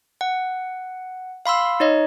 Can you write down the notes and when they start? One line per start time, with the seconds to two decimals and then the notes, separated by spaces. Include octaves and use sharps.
0.21 F#5
1.46 F5 B5 C6 E6
1.80 D#4 C#5 D#5